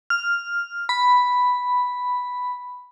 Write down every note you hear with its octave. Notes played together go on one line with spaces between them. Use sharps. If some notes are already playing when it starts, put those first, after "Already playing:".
F6
B5